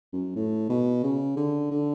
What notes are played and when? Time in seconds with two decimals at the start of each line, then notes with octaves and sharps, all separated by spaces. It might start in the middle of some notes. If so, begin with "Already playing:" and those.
0.13 F#2
0.36 A2
0.69 B2
1.04 C#3
1.36 D3
1.71 D3